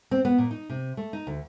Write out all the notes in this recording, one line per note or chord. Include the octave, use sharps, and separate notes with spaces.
C4
B3
A#2
D#4
C3
A3
D#4
D2